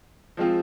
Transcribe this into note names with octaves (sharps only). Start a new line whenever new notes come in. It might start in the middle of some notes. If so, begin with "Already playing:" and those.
F3 G#3 C4 F4